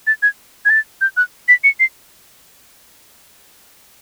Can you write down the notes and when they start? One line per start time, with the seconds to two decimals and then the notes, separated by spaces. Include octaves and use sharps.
0.07 A6
0.23 G#6
0.65 G#6
0.70 A6
1.01 G6
1.17 F#6
1.48 B6
1.64 C#7
1.80 C7